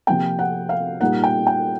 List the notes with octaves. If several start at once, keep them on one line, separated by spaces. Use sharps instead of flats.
C3 F3 A#3 G5
F#5
F5
A#2 G3 A#3 D#4 F#5
G5
G5